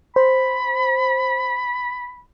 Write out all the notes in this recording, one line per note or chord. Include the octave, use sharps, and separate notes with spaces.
C5 B5